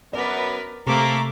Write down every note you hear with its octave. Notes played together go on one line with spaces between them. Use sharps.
F#2 B3 A#4 B4 D5
C3 A3 A#3 C4 A4 A#5 D6